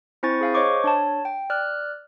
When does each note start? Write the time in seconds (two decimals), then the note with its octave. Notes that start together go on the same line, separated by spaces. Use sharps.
0.23 C4 E4 C5 G#5 C#6 A6
0.41 G#4 F5 G#5
0.54 C5 C#5 D#5 C#6 D6
0.84 D4 C#5 A5
1.25 G5
1.50 D5 F6 F#6